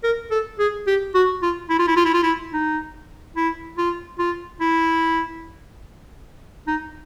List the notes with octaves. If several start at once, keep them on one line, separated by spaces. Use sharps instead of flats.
A#4
A4
G#4
G4
F#4
F4
E4
F4
E4
F4
E4
F4
E4
D#4
E4
F4
F4
E4
D#4